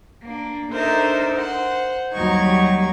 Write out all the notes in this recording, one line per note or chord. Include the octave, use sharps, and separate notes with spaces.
A#3 D4
D4 D#4 A4 A#4 C5 E5
C5 F#5
D#2 F#3 G3 D#4 C#6 G#6